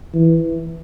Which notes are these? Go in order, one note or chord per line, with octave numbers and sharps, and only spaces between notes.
E3